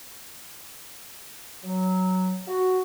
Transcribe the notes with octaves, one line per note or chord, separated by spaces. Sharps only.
F#3
F#4